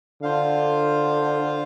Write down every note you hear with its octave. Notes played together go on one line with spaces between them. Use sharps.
D3 F4 C5 F5